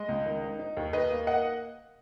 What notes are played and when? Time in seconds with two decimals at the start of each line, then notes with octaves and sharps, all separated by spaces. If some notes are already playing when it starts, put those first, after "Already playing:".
Already playing: G#3 D#5
0.09 C#2
0.26 D#3
0.43 D#4
0.59 D#4
0.77 D#2
0.93 D#2 B4 D#5
1.10 A#3
1.27 A#3 D#5 F#5